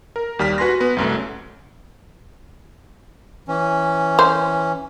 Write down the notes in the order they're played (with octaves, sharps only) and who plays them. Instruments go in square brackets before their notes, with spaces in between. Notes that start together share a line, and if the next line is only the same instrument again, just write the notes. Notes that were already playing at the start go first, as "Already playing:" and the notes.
[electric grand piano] A#4
D#2 G3 F6 B6
F#4 B4 G#5 C6 A#6
B3 B4
C2 F#2 A3
[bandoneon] E3 C#4
[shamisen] C5